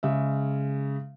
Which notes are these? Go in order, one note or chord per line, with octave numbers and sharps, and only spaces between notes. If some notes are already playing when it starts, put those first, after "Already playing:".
C#3 G#3 E5